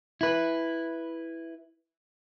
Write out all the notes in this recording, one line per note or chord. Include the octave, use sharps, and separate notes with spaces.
E4 B4